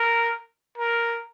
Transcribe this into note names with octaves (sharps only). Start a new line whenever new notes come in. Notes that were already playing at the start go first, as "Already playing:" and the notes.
Already playing: A#4
A#4